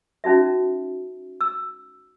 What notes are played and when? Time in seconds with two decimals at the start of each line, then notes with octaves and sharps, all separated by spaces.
0.24 C#4 D#4 F#4 E5
1.41 E6